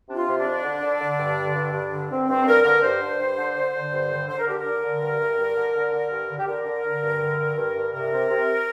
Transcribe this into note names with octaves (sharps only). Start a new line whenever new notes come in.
C3 D4
F4
C3
D4
F2
D3
D3
D3
G2
D3
G2
G2
D3
D3 C4
G2 C4
G2 A#4
D3 A#4
G2 C5
D3
G2
D3
D3
D3
G2
D3
D3 C5
A#4
D3 G4
A#4
D3
D3
G2
G2
G2
D3
D3
D3
G2
D3
G4
D3 A#4
D3
D3
G2
D3
G2
G2
G2
C3 A#4
C3
C3